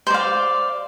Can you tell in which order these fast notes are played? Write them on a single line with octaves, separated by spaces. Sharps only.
C5 D5 F5